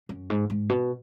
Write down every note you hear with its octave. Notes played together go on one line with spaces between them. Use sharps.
F#2
G#2
G#2
B2